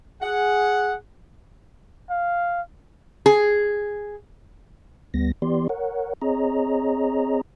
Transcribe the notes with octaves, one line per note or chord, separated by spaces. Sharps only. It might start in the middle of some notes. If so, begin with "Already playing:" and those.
G#4 F#5
F5
G#4
D2 G3 B3 A#6
E3 B3 G4 D5 C6
A#4 C#5 F#5
C4 G#4 C#5 D#5 A#5